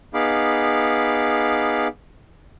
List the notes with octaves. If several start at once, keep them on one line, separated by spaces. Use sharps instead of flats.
B3 D#4 G#4 F5 B5 D6